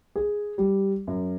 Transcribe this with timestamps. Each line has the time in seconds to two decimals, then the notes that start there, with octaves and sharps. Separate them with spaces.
0.16 G#4
0.58 G3
1.07 F#2